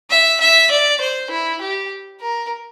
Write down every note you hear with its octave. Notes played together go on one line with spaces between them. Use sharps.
E5
E5
D5
C5
E4
G4
A#4